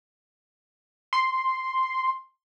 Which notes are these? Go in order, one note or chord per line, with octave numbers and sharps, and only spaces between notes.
C6